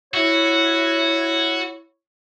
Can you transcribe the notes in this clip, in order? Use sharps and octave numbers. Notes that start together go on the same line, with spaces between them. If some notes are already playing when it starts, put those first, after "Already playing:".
E4 F#4 C#5